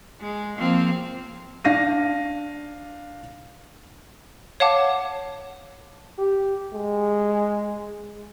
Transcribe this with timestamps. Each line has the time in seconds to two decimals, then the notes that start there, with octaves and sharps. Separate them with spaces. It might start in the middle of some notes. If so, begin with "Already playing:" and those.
0.21 G#3
0.56 F3 A#3 C4
1.64 D4 F5 A#6 D#7
4.60 C#5 F5 F#5 A5 D6
6.18 G4
6.73 G#3